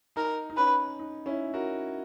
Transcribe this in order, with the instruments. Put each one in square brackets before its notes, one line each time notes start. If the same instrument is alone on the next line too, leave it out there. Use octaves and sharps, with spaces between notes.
[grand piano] D#4 [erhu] A#4
[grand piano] D#4
[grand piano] C#4 [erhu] B4
[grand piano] D#4
C#4 E4
F#4 A#4